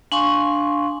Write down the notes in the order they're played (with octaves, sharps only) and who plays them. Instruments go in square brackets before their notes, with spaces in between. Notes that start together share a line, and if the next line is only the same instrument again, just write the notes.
[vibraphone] D4 F5 G#5 C6 C#6